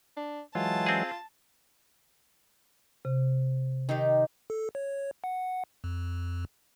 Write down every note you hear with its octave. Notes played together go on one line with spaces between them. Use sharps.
D4
E3 F#3 G#3 F4 A5
C4 G#4
C3
D#3 D#4 G4
A4
C#5
F#5
F2